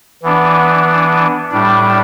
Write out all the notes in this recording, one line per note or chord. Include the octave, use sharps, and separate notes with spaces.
E3 B3 D4
A2 G3 D4